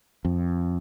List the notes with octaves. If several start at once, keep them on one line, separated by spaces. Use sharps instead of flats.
F2